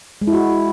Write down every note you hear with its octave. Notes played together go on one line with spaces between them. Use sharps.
G#3
E4
F#4